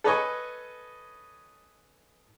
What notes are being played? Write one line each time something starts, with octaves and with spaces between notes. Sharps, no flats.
A4 B4 C#5 D#5 G#5 C#6